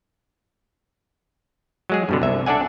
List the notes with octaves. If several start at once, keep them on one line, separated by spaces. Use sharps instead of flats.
F#3 G#3 G#4
G2 B2 D3
C2 E5
D4 A4 D5 F#5 G#5